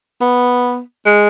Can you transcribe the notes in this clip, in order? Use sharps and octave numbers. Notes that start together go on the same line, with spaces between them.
B3
G#3